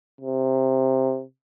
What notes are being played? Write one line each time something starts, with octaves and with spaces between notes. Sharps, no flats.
C3